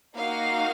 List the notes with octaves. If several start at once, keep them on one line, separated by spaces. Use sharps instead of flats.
A#3 D#4 F#4 F5